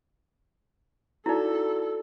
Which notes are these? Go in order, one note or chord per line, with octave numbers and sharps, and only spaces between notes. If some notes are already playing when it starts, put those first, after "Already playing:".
D#4 E4 F#4 A4 D5